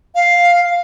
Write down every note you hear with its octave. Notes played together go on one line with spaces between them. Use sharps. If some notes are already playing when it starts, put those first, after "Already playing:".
F5